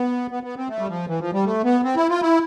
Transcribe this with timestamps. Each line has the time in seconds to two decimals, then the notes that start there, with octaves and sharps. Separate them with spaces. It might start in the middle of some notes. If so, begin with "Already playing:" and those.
Already playing: B3
0.31 B3
0.43 B3
0.57 C4
0.69 A3
0.79 G3
0.88 F3
1.08 E3
1.19 F3
1.33 G3
1.45 A3
1.64 B3
1.84 C4
1.96 E4
2.09 F4
2.22 E4